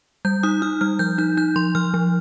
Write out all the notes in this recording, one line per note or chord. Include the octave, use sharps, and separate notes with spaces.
G3 G6
D#4 D#6
D#4 F6
G3 F6
F3 G6
D#4 G6
D#4 G6
F3 C6
F3 F6
F3